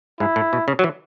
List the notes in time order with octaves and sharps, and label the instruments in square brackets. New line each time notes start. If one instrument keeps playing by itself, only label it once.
[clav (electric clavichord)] G#2 [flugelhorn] E4
[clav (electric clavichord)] A2
B2
C#3
F#3
E3